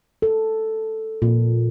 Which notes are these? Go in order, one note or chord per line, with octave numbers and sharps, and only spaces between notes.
A4
A#2